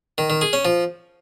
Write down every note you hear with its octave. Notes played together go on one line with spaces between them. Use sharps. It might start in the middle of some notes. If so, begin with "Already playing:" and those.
D#3
D#3
G#4
C#4
F3